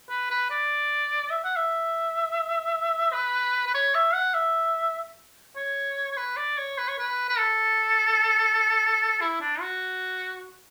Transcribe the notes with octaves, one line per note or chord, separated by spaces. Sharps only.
B4
B4
D5
E5
F#5
E5
B4
B4
C#5
E5
F#5
E5
C#5
C#5
B4
D5
C#5
B4
C#5
B4
B4
A4
E4
D4
F#4